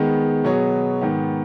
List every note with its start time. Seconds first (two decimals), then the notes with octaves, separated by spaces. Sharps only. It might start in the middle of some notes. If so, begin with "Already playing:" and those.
Already playing: D#3 G#3 B3
0.44 B2 F#3 B3 G#4 C#5
1.01 G#2 D#3 B3